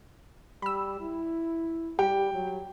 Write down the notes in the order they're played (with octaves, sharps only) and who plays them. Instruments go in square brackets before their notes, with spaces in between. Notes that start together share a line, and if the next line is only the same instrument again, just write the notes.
[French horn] G3 [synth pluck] B5 E6
[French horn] E4
[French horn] G3 [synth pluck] G4 [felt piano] G5
[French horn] F#3